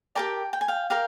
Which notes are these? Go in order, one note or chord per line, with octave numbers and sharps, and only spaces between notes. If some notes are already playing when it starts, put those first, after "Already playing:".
G4 A#4 D5 G5 A5
G5
G#5
F5 G5
G4 A#4 F5 G5